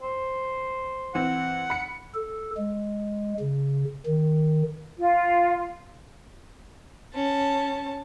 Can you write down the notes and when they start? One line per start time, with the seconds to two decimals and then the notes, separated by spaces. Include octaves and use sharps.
0.02 C5
1.15 E3 C4 F#5
1.70 B5 C#7
2.14 A4
2.57 G#3
3.40 C#3
4.06 D#3
4.98 F4
7.15 C#4 A5